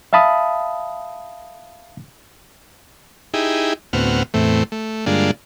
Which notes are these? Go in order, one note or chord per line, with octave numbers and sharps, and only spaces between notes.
E5 F5 A5 B5 D#6
D#4 E4 G4 G#4
D2 A2 B3 C4 F#4 F6
E2 A2 A3 C4
A3
G2 D3 G#3 A#3 D4 F4